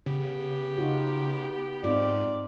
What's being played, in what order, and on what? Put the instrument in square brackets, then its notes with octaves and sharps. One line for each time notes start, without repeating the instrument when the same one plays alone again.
[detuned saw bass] C#3 [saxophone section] B3 G4
[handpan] D#4 F4 F#4
[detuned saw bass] G#2 [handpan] C4 D#4 F4 [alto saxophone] D5